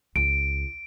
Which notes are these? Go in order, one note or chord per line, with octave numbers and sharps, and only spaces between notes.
C#2 D7